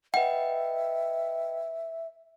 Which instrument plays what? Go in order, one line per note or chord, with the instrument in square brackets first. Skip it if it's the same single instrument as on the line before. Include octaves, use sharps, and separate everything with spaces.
[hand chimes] B4 D#5 G5 [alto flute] E5 [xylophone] F#5